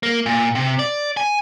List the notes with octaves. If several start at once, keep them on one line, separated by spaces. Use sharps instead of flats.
A#3
A#2
C3
D5
G#5